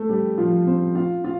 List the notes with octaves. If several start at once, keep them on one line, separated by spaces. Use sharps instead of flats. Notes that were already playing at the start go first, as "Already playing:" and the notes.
Already playing: A3 A4
G3 G4
F3 F4
C4 C5
F4 F5
F4 F5